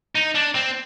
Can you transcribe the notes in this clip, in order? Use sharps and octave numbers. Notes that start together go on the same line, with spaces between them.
D#4
D4
C4